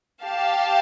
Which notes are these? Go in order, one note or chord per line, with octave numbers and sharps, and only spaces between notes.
G4 F5 A5